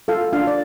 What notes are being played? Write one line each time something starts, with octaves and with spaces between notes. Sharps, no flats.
F4 A4 F5
D4 F4 F5
D5